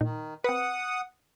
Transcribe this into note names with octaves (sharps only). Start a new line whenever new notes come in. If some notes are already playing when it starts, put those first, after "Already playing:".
A#2 D#3 D#4
C4 B4 F#5 D#6